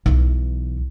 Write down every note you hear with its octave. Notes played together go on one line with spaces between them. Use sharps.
B1 E3